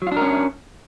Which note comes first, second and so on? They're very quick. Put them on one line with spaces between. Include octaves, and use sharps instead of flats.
F#3 F4 D4 A#4 C#4